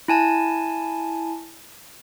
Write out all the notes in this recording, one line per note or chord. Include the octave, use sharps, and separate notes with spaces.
E4 G#5 A5